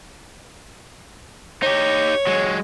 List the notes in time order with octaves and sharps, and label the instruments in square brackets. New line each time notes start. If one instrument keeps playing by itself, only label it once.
[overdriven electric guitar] D#4 G4 [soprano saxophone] C#5
[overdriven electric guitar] F#3 G#3